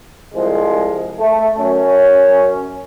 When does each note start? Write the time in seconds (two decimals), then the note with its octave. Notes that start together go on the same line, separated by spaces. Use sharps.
0.34 C2 F3 G#3
1.19 A3
1.58 F#2 C#4